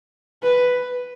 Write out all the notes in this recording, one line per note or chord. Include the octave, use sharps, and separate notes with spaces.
B4